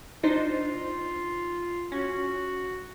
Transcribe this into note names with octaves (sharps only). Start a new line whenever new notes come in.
D4 D#4 F4 C5
C#4 F#4